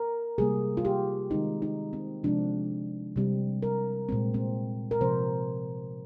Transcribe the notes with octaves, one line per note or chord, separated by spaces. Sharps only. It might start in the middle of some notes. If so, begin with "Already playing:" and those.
Already playing: A#4
C3 G3 A#3 G#4
F4
G4
D#3 G#3 C4 D#4
D#4
C4
C3 F3 G#3 C4 D4
C3 G3 C4
A#4
A#2 G#3 C4
C4
A#4
C3 F3 C4 C5